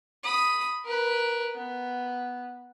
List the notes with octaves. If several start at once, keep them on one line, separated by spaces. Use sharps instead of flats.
B5 D#6
A#4 B4
B3